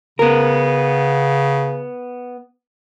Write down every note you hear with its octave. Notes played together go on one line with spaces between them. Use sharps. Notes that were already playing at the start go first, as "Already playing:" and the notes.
C#3 B3 A#4